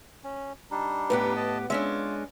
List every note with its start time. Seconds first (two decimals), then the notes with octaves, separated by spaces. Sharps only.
0.24 C#4
0.71 G3 D4 D#4
1.10 A2 B3 G4 B4
1.36 D#5 A5
1.70 G#3 C#4 D4 F4 E5